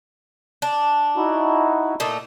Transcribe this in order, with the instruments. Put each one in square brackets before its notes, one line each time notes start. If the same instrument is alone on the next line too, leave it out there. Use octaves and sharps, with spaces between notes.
[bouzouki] D4
[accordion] D#4 E4 F#4
[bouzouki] A#2 A3 D#4